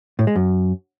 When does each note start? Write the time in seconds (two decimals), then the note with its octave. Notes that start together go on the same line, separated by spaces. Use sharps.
0.19 A2
0.27 G#3
0.36 F#2